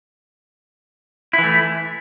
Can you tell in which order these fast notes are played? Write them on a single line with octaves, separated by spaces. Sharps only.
E4 E3 A3